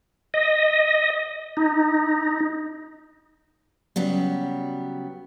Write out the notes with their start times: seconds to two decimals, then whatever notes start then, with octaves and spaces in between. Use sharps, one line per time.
0.34 D#5
1.57 D#4
3.96 C#3 F#3 G3 B3